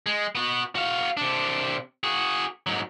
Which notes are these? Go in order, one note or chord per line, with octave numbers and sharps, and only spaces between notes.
G#3
B3 F#4
F#4 F5
C3 D4
F#4 G#4
G#2 F#3